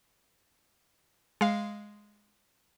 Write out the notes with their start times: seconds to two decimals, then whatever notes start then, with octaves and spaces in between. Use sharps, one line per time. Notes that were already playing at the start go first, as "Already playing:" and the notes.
1.41 G#3 F5